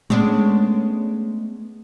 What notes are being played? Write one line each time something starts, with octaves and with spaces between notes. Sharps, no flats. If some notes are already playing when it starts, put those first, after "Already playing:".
G#3 A3 B3 C#4 D4